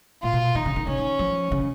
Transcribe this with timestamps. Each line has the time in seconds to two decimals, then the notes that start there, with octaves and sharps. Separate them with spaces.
0.23 A#2 F4
0.33 B2
0.55 D#3 D#4
0.66 C#3
0.76 D#3
0.87 C#3 C#4
0.98 D#3
1.19 F3
1.52 C#3